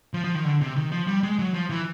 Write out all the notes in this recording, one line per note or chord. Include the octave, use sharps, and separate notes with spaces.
F3
F3
D#3
D3
C3
D#3
F3
G3
G#3
F#3
F3
E3